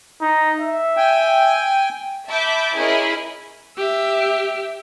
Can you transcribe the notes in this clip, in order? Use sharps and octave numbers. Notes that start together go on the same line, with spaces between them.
D#4
E5
G5 G#5
E5 A5 B5 D6 G6
C#4 E4 G#4 A#4 D#5 B5
G4 E5